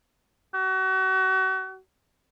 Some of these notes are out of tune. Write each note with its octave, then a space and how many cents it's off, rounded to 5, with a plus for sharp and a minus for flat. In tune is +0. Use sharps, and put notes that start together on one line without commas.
F#4 +35